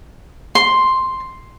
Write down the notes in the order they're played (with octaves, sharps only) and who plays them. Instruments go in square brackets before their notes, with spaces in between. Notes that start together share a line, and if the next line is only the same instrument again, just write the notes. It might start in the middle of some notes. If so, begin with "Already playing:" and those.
[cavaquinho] C6